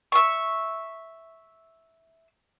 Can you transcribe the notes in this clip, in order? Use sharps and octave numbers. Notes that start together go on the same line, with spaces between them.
E5 C#6